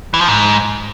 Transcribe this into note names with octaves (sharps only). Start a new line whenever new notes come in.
E3
F3
G#2